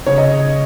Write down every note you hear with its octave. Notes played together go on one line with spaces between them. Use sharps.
C#3 C#5
D#5